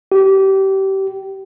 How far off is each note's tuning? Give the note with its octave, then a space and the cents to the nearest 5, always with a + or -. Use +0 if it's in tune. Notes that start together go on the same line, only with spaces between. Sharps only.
G4 -25